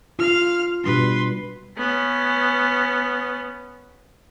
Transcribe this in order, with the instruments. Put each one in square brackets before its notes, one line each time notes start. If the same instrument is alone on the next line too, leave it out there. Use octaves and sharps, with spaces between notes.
[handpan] F4 [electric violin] F5 F6
[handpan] B2 G3 D4 [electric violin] B4 C6
[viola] B3 C#4